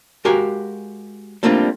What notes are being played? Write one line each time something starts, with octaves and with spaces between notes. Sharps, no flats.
G#3 F#4 G4 A#4 F5 G#5
G3 A3 A#3 C4 D4 F4